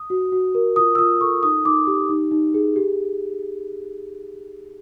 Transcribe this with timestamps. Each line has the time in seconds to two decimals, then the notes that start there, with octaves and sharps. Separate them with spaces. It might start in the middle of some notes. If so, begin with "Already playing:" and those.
Already playing: D#6
0.10 F#4
0.32 F#4
0.55 A#4
0.76 F4 D#6
0.95 E6
0.98 F4 D#6
1.21 A4 C#6
1.43 D#4 D#6
1.65 D#4 D6
1.87 G4
2.09 D#4
2.31 D#4
2.54 G#4
2.76 G4